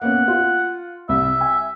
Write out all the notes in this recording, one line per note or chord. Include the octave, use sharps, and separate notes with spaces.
A#3 B3 C#4 F#5
F4
C2 E5
G#5